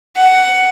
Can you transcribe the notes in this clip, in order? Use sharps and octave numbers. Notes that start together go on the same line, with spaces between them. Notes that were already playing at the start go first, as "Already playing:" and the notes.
F#5